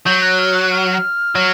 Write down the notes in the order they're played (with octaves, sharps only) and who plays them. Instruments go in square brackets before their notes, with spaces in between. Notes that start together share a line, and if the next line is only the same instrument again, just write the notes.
[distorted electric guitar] F#3 [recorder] G6
[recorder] F#6
F6
F#6
F6
[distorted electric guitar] F#3